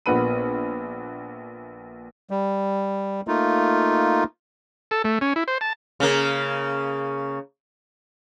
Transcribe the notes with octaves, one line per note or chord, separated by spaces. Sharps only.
A#1 A#2 B3 F#5 B5 D#7
G3
A3 A#3 D#4 F4
A4
A3
C#4
E4
C5
A5
C#3 A#3